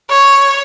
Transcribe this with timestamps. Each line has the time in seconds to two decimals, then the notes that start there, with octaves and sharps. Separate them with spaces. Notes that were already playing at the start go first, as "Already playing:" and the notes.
0.10 C#5